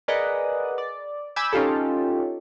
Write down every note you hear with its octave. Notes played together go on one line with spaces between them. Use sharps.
G#4 A#4 B4 D5 D#5 F#5
D5
G#5 B5 D6 E6 G6
C#4 D#4 F4 G4 A4